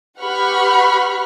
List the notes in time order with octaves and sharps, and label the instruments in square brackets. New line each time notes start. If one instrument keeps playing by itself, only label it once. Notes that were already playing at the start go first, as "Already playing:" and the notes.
[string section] G4 B4 F#5 B5 C#6 F6